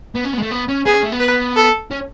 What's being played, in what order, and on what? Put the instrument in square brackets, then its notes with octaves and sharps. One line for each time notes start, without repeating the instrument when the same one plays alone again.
[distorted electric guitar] B3
C#4
B3
G#3
A3
B3
C#4
[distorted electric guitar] B3 [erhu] G#4
[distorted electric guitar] C#4
A3
B3
[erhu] B4
A4
[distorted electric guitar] C#4